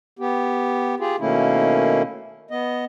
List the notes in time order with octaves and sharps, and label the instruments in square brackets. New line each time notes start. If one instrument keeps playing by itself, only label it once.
[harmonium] B3 G4
F4 G4 G#4
B2 D#3 A3 A#3 C#4 E4
B3 D#5